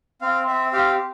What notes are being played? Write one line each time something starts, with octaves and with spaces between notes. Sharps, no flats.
C4 F5
C4 E5
G4 F5